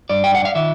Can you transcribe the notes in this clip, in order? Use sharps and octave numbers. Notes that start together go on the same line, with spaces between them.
G2 D5
G5
F#5
F5
D#3 E5